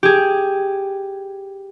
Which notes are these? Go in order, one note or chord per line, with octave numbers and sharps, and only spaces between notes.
G4 G#4